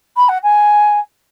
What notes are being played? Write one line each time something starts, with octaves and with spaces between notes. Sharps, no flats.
B5
F#5
G#5